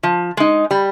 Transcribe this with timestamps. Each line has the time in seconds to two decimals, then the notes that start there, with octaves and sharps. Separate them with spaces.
0.03 F3
0.37 G#3 D#4
0.71 G3